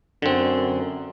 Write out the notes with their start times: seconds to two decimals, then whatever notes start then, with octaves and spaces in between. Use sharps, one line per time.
0.22 F#2 D3 C4